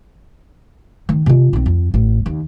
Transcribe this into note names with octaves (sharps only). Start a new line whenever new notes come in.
D#3
C3 F4
B1 C4
F2
A1
D#2